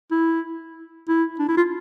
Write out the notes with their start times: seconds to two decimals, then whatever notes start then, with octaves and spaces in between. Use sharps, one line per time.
0.11 E4
1.09 E4
1.39 D4
1.48 E4
1.57 F4